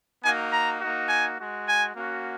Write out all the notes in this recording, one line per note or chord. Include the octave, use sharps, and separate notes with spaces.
A#3 D#4 F#4 G#5
A#5
A#3 D#4 F#4
G#5
G#3 F#4
G#5
A#3 C#4 F#4